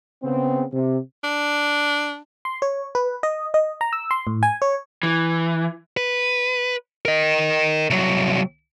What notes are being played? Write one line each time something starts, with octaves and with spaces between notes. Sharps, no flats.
C#3 B3 C4
C3
D4
C6
C#5
B4
D#5
D#5
A#5
E6
C6
A2
G#5
C#5
E3
B4
A#4 D#5
C2 F#3